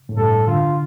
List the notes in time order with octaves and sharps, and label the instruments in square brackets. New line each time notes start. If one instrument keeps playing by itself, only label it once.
[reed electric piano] A2
[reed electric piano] G2 [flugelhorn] A4
[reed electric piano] D3 [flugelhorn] F4